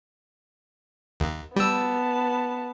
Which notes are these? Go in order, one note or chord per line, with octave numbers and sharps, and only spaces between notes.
D#2
G3 B3 A5 E6